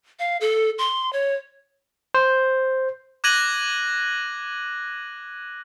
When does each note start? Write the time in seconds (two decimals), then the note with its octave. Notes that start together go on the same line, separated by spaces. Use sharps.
0.19 F5
0.41 A4
0.78 C6
1.13 C#5
2.14 C5
3.24 D6 F#6 G#6 A#6 D#7 F#7